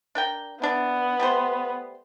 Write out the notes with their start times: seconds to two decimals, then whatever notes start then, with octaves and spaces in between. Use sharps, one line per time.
0.15 D4 A#4 G5
0.62 B3 D4 E4
1.19 G3 A3 C5